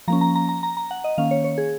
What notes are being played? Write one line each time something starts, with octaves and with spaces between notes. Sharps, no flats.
F3 A#3 C#4 A#5
A#5
A#5
A#5
A#5
A#5
F#5
D#5
D#3 A#3 C#4 F5
C#5
C#5
G#4